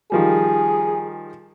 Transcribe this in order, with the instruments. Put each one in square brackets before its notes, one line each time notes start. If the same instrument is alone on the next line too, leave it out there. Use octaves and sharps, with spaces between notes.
[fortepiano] D#3 F3 G3 [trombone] G#4